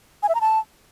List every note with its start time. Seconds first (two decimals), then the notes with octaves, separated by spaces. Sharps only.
0.23 G#5
0.29 E5
0.35 A#5
0.41 A5